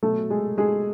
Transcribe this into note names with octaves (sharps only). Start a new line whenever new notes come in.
B2 F#3 A3 A4
G#3 G#4
G#3 G#4